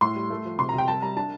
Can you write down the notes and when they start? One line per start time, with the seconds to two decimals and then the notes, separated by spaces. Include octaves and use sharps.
0.01 A2 C6
0.16 G3
0.30 A3
0.45 F3
0.59 C3 C6
0.69 A#5
0.74 C3 G5
0.88 G3 A5
1.02 G3 A#5
1.16 D4 A5